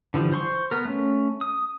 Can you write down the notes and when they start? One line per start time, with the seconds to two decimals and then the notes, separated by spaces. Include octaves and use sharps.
0.14 D3 E3 F3 G3
0.32 C5 C6 C#6
0.71 B3 A#4
0.85 A3 C#4
1.41 D#6